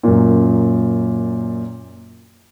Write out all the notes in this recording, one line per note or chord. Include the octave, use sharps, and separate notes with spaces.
F#2 A#2